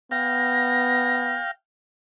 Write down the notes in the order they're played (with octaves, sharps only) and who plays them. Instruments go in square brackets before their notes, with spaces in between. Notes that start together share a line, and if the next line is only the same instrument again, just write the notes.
[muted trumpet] B3 [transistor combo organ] F5 G5 [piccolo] A#6